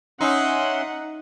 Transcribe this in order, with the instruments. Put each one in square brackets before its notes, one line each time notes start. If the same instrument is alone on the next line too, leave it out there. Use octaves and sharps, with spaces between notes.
[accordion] C#4 E5 C6 [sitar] D#4 [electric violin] F#5